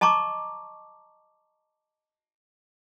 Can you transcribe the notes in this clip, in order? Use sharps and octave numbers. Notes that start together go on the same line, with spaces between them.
D#5 A5 A#5 C#6 D6